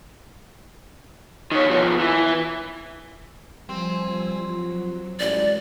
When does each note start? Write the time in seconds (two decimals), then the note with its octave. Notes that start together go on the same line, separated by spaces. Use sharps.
1.51 D#3 C#5
1.69 B2 F3
2.00 E3
3.69 F3 G3 C4 G#5 E6
4.41 F3 F#3
5.20 A1 G#3 F#4 D5